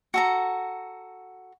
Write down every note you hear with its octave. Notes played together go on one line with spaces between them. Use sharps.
F#4 A4 A#5